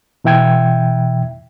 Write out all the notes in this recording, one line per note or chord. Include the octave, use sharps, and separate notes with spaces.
B2 E3 E5 G5 G#6